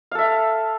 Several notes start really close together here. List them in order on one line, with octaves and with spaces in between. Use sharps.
F5 A4 E5